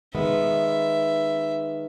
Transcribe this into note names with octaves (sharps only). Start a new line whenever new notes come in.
D#3 G#3 B3 E5